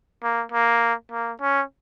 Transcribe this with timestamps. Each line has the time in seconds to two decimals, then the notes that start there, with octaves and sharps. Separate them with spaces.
0.23 A#3
0.52 A#3
1.12 A#3
1.41 C#4